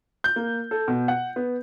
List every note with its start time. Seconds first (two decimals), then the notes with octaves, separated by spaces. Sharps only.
0.24 G6
0.36 A#3
0.71 A4
0.88 B2
1.08 F#5
1.36 B3